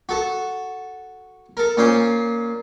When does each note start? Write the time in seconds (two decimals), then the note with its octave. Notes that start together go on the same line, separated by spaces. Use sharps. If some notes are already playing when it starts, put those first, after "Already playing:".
0.09 F#4 A4 A5
1.57 A4 A#4
1.77 A#2 C#4 C5 D#6